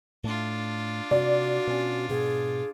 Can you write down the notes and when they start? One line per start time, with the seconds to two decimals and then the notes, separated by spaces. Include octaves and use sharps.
0.24 A2 A3 D4 F4
1.11 C3 F#4 D5
1.67 B2 C#4
2.09 G#2 B2 G#4